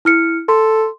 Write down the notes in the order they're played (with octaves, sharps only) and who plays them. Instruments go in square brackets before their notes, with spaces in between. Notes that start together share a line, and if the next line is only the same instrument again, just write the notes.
[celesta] E4 F6 C#7
[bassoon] A4 [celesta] C6